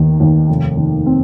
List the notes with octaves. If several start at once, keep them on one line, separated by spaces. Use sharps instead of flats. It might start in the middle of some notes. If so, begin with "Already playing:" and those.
Already playing: D#2 D#3
D#2
F1
D#3
C4